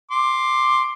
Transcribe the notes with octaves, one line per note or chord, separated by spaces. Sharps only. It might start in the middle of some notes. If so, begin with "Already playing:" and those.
C6 D6